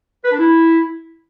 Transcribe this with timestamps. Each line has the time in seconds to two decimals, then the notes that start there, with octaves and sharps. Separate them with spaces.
0.24 B4
0.32 D4
0.39 E4